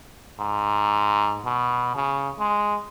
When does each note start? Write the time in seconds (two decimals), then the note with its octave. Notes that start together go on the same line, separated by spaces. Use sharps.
0.39 G#2
1.45 B2
1.95 C#3
2.39 G#3